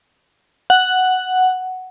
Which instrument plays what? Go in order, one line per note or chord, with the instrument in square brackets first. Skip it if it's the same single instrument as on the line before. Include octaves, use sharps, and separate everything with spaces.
[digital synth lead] F#5